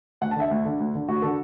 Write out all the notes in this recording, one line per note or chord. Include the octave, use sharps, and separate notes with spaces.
D2 F#5
A5
D3 E5
D2
D3
D2
D3
D2 F#4
D3 A4